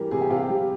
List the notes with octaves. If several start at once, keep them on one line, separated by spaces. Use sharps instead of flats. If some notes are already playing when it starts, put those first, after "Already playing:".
Already playing: E3 G3 A#4
C3 G#4
G4
C3 F4
G4
G3